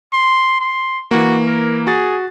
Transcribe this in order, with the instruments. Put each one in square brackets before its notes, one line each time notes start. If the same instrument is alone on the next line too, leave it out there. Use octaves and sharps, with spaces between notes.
[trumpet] C6
C6
[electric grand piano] E3 A#3 [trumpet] F#4
[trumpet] A#4
[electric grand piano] F#4 A6 [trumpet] G#4